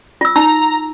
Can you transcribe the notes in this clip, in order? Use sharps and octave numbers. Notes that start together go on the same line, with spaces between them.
F4 E6
D#4 A#5